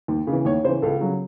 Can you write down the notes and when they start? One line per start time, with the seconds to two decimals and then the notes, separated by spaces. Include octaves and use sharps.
0.08 D#2
0.27 C#3 E3
0.45 D#2 C#5
0.64 C#3 C5
0.68 E3
0.82 C#2 A4
1.01 C#3 F#3